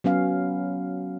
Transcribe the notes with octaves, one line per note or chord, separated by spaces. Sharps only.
F#3 B3 C#4 F5